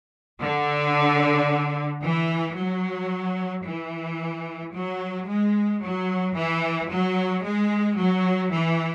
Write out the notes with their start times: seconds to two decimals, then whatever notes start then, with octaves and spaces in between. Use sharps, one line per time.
0.40 D3
2.02 E3
2.56 F#3
3.65 E3
4.73 F#3
5.27 G#3
5.81 F#3
6.35 E3
6.89 F#3
7.43 G#3
7.97 F#3
8.51 E3